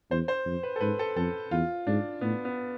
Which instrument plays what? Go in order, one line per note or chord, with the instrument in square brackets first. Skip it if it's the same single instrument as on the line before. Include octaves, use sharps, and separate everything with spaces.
[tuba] E2 [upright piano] C5
[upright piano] C5
[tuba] F2
[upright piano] B4
A4
[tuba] G#2 [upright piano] B4
[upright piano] A4
[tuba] F2 [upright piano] A4
[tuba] E2 [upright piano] F4
[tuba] G#2 [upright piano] D4
[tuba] A2 [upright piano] B3
[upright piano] B3